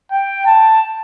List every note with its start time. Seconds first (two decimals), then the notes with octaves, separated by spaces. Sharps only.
0.12 G5
0.46 A5